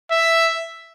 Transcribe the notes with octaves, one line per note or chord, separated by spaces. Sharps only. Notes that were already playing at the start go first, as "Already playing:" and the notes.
E5